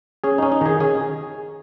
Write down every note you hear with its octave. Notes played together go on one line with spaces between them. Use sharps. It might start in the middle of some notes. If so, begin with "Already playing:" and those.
C#4 G#4
C#4 D#4
D#4
D#3 G#4
C#4 G#4